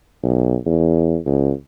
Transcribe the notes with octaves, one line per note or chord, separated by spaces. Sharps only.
B1
E2
C#2